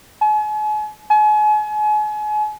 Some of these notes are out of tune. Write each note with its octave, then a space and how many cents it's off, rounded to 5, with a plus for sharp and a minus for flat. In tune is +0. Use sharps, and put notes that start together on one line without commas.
G#5 +40
G#5 +35